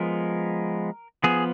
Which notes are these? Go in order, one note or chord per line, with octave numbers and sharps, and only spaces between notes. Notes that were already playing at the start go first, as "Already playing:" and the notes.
Already playing: F3 G#3 B3 A#4
F3 B3 G#4